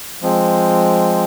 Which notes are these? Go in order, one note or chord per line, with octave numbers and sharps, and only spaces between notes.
F3 G#3 C4